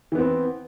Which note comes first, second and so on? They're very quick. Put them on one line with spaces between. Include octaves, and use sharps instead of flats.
E3 B3 C4